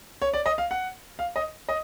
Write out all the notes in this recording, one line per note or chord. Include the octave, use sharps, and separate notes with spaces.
C#5
D5
D#5
F5
F#5
F5
D#5
D#5